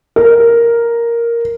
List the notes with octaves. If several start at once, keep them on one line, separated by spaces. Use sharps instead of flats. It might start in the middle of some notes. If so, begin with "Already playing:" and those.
A#4